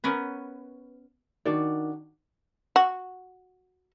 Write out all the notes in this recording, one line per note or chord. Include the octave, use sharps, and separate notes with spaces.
B3 C#4 A#4 B4
D#3 D4 F#4 D5
F#4